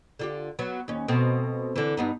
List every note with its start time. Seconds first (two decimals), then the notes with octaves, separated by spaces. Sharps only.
0.19 D3 F4 G4
0.59 F#3 B3
0.88 D#2 C#4
1.08 B2 A3 C4
1.76 D3 E3
1.97 G2 B3 D#4